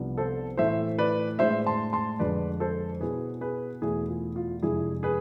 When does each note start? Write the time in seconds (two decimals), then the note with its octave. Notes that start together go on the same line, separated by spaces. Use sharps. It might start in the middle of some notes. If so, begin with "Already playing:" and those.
Already playing: C2 C3 F3 B3 D4
0.17 A4 C5
0.57 A2 E3 A3 E4 C5 E5
0.99 B4 D5
1.39 A2 G#3 D4 C5 E5
1.67 A5 C6
1.93 A5 C6
2.19 F2 D3 G#3 D4 B4 D5
2.60 A4 C5
3.01 B2 B3 E4 G#4 B4
3.41 G#4 B4
3.82 E2 B2 A3 E4 G#4
4.09 F4
4.36 F4
4.62 F2 C3 G#3 D4 E4 G#4
5.03 G#4 B4